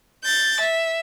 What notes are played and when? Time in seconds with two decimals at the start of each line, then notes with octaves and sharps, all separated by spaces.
0.24 G6 A6
0.60 E5